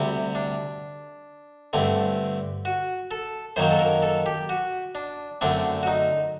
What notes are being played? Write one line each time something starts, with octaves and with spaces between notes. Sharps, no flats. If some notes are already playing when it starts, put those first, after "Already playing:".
Already playing: D2 C3 G3 C4
D4
G2 D3 A3 C4
F#4
A4
F#2 D#3 F#3 A#3 C5
A4
A#4
A4
G4
F#4
D4
F#2 D3 A3 C4 D4
F#4
D#4